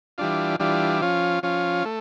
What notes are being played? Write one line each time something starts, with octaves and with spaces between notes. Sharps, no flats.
E3 G3 D4 F4
E3 G3 D4 F4
F3 C#4 F4
F3 C#4 F4
A3